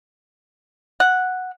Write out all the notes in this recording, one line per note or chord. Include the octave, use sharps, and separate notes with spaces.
F#5